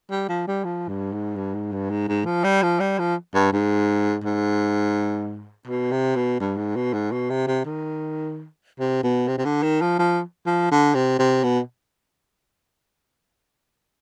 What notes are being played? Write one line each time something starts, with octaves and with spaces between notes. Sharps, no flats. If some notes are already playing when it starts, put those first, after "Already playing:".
G3
F3
G3
F3
G2
G#2
G2
G#2
G2
G#2
G#2
F3
G3
F3
G3
F3
G2
G#2
G#2
B2
C3
B2
G2
G#2
B2
G#2
B2
C3
C3
D#3
C3
B2
C3
C3
D3
D#3
F3
F3
F3
D3
C3
C3
B2